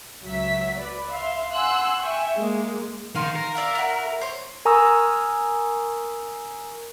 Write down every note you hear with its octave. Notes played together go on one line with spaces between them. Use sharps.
C#2 F#3 E5 B6
B4 D5
E5 F5 C6
F#5 G#5 C6 E6 F#6
E5 G5 G#5 C#6
G#3 A#3
D#3 F5 C6
A#4
D5 E5 F5
E4 F#4
C5 C#5
A#4 G#5 A#5 C#6 D#6 E6